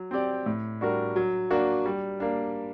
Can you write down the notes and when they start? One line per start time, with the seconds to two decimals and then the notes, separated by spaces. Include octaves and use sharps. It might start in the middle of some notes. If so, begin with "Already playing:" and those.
Already playing: F#3
0.11 C4 G4 D5
0.46 A2
0.81 G3 D4 F#4 A#4
1.16 F#3
1.50 A#3 D4 F#4
1.86 G3
2.20 A#3 D4